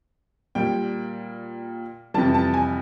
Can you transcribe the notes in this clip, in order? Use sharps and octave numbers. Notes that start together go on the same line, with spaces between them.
A#2 G3 G5
F2 C3 E3 G3 A5
A5
G#5